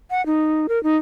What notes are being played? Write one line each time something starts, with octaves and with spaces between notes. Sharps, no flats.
F#5
D#4
A#4
D#4